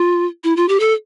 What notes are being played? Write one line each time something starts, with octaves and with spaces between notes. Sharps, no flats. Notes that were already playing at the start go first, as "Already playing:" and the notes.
Already playing: F4
E4
F4
G4
A4